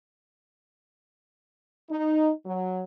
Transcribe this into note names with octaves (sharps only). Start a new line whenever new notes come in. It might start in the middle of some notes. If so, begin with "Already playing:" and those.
D#4
F#3